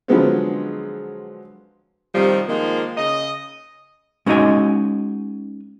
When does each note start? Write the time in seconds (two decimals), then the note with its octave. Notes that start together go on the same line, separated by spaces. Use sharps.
0.08 D3 F3 F#3 G#3 B3 C4
2.15 C3 D#3 F3 G3 D#4
2.48 D#3 F3 G#3 A#3
2.97 C#3 D#5
4.26 G#3 C#4 D#4 F#4 D#5 G#5